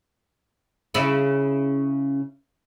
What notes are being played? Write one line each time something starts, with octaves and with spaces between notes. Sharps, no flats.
C#3 E4